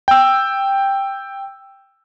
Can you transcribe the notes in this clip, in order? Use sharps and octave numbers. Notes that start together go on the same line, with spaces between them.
G5 E6